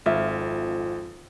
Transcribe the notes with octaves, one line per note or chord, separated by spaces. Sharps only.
G#1 F2 F4 E5